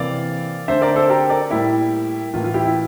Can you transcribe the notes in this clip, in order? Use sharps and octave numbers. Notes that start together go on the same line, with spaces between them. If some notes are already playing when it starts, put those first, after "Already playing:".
Already playing: C3 E3 A#3 D5 F5
D3 A3 C4 C5 E5
A#4 D5
A4 C5
G4 A#4
A#4 D5
A2 G3 A#3 E4 G4
A2 E3 A#3 F4
F4
E4 G4
E4